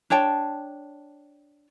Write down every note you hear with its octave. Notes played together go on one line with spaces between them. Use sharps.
D4 C#5 G5 A5